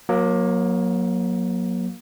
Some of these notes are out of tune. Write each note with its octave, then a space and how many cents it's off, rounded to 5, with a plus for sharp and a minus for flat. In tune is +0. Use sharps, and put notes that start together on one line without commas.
F#3 -20 A#3 +20